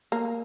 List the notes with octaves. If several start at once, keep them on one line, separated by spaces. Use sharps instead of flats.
A#3